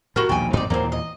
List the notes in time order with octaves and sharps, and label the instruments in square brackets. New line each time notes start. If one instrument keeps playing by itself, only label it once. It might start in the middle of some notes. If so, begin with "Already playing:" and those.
[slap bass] A2 [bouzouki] F#4 A#4
[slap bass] A#1 D#2 B2 [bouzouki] G5 G#5
[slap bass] G#2 C4 [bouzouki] D#4 D5
[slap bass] D#2 A#2 E3 [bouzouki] A#3 C4
[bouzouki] D#5